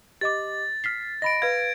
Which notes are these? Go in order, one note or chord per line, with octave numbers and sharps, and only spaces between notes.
G4 D#5 D6 A6
F6 B6 C7
D#5 B5 A#6 D7
B4 F5 G#6